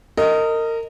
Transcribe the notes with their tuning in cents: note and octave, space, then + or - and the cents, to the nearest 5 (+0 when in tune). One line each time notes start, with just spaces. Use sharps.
A#4 -30 D#5 +0